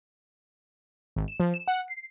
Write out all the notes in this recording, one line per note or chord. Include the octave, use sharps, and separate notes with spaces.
G#1
E7
F3
E7
F#5
C7